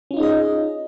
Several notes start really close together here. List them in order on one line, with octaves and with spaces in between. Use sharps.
C#4 F4 D#4 G#4 D#5